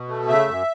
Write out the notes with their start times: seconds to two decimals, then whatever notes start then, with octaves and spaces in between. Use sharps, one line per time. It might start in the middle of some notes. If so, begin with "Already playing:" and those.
Already playing: B2
0.08 A3
0.28 C#3 E5
0.48 F#2